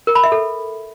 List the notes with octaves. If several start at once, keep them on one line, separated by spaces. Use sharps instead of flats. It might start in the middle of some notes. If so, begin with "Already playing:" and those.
A#4
B5
E5
A4